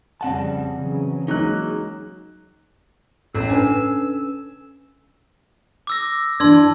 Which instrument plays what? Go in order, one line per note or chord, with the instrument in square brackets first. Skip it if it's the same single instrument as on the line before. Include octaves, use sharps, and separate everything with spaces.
[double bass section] F2 C#3 G3 [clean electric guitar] C4 F#5 A5
[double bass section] C#3 E3 F#3
[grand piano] F#3 A#3 F#6 [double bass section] G#3 [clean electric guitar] D#4
[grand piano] A1 [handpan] C#4 A4 [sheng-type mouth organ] E6
[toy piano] D4 B4 [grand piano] G#5
[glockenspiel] D6 E6 A#6
[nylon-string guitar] E3 D4 [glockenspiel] C6 E6 G#6